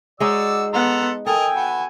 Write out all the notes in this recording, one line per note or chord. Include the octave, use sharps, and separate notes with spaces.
G#3 D#4 F#4 C#5 D5 E6
B3 A4 F#5 A#5 C6
A4 A#4 D#5 G5 G#5
B3 F#4